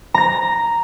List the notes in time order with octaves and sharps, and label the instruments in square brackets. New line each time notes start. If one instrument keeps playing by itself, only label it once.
[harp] A#5 A#6